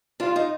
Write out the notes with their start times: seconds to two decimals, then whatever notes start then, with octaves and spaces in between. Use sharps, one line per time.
0.20 D4 F4
0.36 D#4